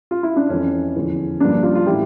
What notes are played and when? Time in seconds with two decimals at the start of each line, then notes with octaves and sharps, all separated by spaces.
0.11 F4
0.23 E4
0.36 D4
0.49 F2 E3 C#4
0.96 E2 D3 F3
1.40 G2 F3 A#3 D4
1.63 D4 F4
1.75 F4
1.86 A2 E3 E4 G4